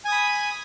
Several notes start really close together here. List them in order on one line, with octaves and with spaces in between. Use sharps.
G#5 D#6 B5